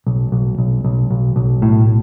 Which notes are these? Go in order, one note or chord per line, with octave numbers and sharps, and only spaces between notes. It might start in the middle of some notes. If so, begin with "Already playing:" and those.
B1
B1
B1
B1
B1
B1
A2